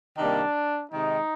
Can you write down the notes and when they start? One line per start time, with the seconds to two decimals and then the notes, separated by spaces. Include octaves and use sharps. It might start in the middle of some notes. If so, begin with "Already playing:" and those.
0.16 C3 D#3 G3 A#3 D4
0.91 C3 D#3 G#3 D#4